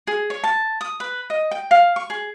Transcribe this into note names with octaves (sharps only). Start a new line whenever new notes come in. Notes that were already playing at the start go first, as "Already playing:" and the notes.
G#4
C#5
A5
D#6
B4
D#5
G5
F5
C#6
G#4